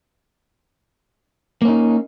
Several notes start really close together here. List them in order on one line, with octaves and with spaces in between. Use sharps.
A#3 C#4 D#4